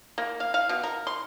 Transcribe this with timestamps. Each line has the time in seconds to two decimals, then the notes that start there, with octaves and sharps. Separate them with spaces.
0.18 A#3
0.40 F5
0.54 F5
0.69 B2
0.83 A#4
1.07 C6